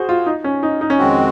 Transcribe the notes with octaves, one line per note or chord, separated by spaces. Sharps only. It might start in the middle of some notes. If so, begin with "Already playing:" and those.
Already playing: F#4 G#4 C5
F4
D#4
C#4
D#4
D#4
C#4
F2 D#3 G#3 C4 F#4